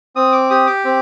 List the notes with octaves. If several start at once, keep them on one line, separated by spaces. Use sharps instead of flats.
C4 D#6
D6
G4 D#6
D6
C4